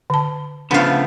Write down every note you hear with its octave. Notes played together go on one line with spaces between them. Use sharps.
D3 A5
C#3 F3 A3 B3 D4 F5